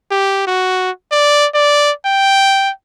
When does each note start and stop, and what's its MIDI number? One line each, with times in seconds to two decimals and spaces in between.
0.11 0.43 67
0.47 0.91 66
1.12 1.47 74
1.54 1.92 74
2.05 2.71 79